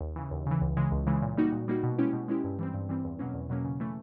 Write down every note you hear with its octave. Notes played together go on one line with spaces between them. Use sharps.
D#2
C#3 E3
D#2
C#3 E3
C#2
C#3 E3 G#3
C#2
C#3 E3 G#3
A#2
G3 A#3 D#4 F#4
A#2
G3 A#3 D#4 F#4
B2
G#3 C#4 E4 G4
B2
G#3 C#4 E4 G4
G2
E3 G3 C4
G2
E3 G3 C4
E2
B2 F#3 A#3 C#4
E2
B2 F#3 A#3 C#4
C#3
E3 A3